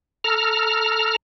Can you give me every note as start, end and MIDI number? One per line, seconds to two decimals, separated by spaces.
0.24 1.16 69
0.24 1.16 82
0.24 1.16 89